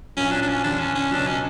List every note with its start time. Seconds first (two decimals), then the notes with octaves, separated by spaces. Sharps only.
0.17 A#1 A#2 F#3 C#4
0.32 D4
0.42 D4
0.49 C#4
0.64 E2 D3 G3 D4
0.80 C#4
0.95 C#4
1.11 C#2 B2 F#3 D4
1.27 C#4